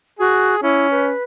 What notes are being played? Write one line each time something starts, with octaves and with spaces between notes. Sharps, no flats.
F#4 G#4
C#4 E4
B4